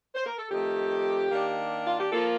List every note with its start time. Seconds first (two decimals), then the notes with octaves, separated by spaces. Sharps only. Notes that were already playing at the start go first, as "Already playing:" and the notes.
0.15 C5
0.26 A#4
0.38 A4
0.50 F2 D#3 A3 G4
1.31 D#3 A#3 D4
1.86 F4
1.98 G4
2.12 F3 A#3 F4 A4